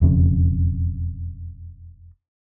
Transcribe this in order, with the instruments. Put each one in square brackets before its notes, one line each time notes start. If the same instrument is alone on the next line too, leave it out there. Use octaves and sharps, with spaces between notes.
[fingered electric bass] E1 F2 C#3